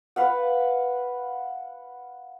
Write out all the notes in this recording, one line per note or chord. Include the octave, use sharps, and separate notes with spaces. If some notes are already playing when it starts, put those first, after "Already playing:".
B4 F5 F#5